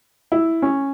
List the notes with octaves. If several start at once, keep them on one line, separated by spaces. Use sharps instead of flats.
E4
C#4